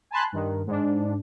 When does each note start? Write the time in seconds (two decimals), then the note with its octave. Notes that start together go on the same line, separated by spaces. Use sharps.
0.11 G#5 A5 B5 C6 F#6
0.32 G2 D#3
0.67 G#2 D4